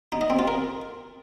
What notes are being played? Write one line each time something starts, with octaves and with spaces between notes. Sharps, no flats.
D#4
D#5
C4
F4
A#4